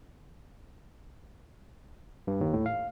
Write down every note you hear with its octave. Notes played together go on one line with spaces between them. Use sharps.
G2
D#2
A2
F5